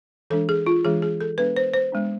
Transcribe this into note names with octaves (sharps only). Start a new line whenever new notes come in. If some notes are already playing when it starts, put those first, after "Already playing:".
E3 G#3 D4 A4
G#4
F4
E3 G#3 D4 G#4
G#4
A4
G#3 B3 D4 B4
C5
C5
G#3 B3 D4